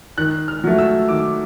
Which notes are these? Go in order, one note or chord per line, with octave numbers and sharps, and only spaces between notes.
D#3 F#6
F6
F#3 A3
E6
D#3 D6